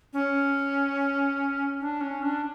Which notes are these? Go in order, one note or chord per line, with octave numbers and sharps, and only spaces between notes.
C#4
D4
C#4
D4